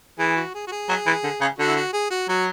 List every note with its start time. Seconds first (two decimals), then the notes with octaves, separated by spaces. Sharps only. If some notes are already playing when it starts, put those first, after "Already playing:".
0.19 E3 G#4
0.36 F#4
0.54 G#4
0.67 F#4
0.72 G#4
0.89 F#3
1.06 E3
1.24 D3
1.41 C#3
1.58 D3 F#4
1.67 E4
1.76 F#4
1.93 G#4
2.11 F#4
2.28 F#3 F#4